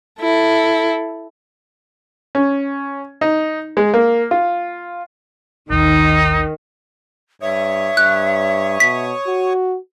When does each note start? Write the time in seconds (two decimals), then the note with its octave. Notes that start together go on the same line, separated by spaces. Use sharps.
0.20 E4 A4
2.35 C#4
3.21 D#4
3.77 G#3
3.94 A#3
4.31 F4
5.70 A1 D#2 D#3 D#4
7.42 G2 C#5 E5 C#6 D#6
7.97 G2 F#6
8.80 B2 B6
9.27 F#4